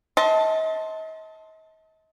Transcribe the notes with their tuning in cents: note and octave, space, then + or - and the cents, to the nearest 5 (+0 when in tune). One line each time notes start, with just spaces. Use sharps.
D#5 +40 A5 +0 C6 +0